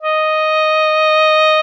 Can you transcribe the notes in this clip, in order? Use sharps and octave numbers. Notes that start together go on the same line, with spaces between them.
D#5